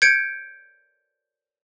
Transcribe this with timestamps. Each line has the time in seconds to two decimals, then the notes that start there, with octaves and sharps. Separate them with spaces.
0.02 G6 G#6 C#7 D7